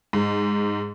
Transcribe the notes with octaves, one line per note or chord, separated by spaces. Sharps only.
G#2